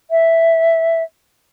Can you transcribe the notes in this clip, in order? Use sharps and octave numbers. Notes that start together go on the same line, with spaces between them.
E5